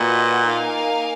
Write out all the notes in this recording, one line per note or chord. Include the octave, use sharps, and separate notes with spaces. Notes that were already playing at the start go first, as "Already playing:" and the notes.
Already playing: A#2 F#4 B4 D#5 F#5
A#3 D#4 A#4 F5 G#5